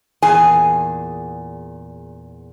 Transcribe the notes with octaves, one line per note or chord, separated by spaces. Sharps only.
E2 A#2 G#4 G#5 A5